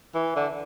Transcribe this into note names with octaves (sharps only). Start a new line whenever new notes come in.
E3
D3